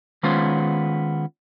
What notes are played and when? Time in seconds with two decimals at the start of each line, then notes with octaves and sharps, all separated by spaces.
0.23 D#3 G#3 B3 C#4 F4 C5